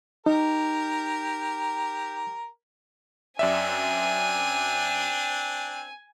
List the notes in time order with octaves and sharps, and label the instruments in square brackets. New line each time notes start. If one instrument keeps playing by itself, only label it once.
[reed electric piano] D#4 [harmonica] G4 A#4
[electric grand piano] F#2 D5 E5 [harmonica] C4 D4 [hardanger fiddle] G#5